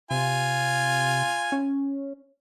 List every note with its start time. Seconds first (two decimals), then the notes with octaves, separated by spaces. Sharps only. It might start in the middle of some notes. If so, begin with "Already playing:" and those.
0.11 C3 F4 G#5
1.52 C#4